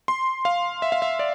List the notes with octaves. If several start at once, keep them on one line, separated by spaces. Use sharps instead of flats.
C6
F5
E5
F5
E5
D5